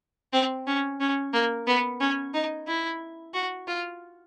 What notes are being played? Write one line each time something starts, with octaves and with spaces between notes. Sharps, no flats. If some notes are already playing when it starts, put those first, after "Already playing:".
C4
C#4
C#4
A#3
B3
C#4
D#4
E4
F#4
F4